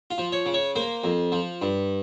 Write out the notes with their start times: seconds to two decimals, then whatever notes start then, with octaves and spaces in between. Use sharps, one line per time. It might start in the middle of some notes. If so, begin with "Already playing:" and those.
0.11 F4
0.18 F3
0.32 C#5
0.46 C#3
0.54 C#5
0.76 A#3 C5
1.04 F2
1.32 F3
1.62 G2